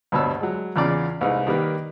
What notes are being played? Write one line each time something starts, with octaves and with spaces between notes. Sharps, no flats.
D2 G2 B2 C#5 A5 E6
F#3 G#3
E2 C#3 F4 D5
C2 G#3 D#4 B4
D#3 G3 A#3 B4